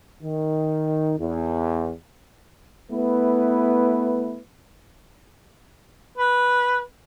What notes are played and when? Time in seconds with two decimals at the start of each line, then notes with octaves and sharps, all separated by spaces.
0.23 D#3
1.17 E2
2.91 A3 B3 E4 B4
6.18 B4